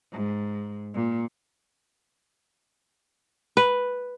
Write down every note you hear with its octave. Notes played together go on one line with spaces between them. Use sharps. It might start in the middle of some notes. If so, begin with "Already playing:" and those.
G#2
A#2
B4